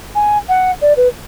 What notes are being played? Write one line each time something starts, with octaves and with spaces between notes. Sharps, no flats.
G#5
F#5
D5
B4